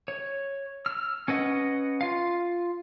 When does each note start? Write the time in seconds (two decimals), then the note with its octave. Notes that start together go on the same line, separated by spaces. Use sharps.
0.08 C#5
0.86 E6 F6
1.28 C#4 B4 D#5 F#5
2.01 F4 F5